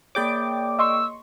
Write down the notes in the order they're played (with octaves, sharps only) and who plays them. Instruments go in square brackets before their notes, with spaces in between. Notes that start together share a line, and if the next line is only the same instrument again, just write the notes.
[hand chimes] A#3 G#4 C#5 [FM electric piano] D5 G5 D6
[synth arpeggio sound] D#5 C6 C#6 [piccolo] E6